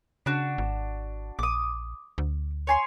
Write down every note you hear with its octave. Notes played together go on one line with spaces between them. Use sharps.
C#3 D4 F#4
G#1
A#1 D6 D#6
D2
C#5 G#5 C6